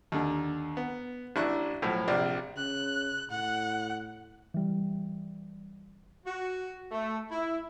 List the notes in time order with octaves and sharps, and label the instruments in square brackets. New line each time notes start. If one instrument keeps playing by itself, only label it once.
[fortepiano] D#2 D3
B3
A1 D4 E4 C#6 F#6
B1 A2 F3
A#1 C3 F4 D5 F5
[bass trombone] C#3 [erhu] F#6
[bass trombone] A2 [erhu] F#5
[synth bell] E3 G3
[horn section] F#4
A3
E4